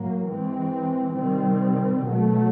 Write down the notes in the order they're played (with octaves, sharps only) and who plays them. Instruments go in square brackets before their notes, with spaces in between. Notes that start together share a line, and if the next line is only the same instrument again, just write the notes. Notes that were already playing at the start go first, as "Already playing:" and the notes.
Already playing: [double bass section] A2 F#3 A#3
E3 G#3 C4
C3 D#3 G3 C4
B2 F#3 A3